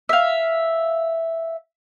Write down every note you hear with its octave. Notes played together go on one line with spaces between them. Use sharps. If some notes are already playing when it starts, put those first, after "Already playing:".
E5 F5